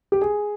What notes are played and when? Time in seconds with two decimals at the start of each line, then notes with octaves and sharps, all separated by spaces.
0.12 G4
0.21 G#4